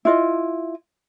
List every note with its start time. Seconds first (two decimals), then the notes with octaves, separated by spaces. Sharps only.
0.05 E4 F4 D#5